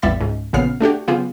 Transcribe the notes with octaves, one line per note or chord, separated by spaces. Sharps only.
A1 E2 G3 E5 B5 A6
C#2 G#2
A#1 A#2 C#3 B3 F6 C7
A3 D4 F#4 G4
C#3 F#3 B3 F4 G4 G#4